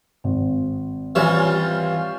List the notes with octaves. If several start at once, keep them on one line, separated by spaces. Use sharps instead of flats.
G#1
E3 G3 C#4 F4 C5 E5